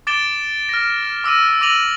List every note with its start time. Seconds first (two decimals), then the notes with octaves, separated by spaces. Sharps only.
0.07 D6 A6 D7 E7 G7
0.69 F6 A#6
1.24 D6 E6 A#6 D#7
1.61 D6 E6 A#6 D#7 F7 F#7